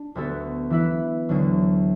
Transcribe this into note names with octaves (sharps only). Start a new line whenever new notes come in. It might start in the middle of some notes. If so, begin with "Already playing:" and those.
Already playing: D4
D2 D3 B3 F#4 A4
E3 B3 E4 B4 E5
D2 D3 F#3